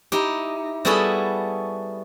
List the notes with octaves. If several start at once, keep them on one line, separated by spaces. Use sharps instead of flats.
D#4 E4 G4
G3 B3 E4 F#4 G#4 A4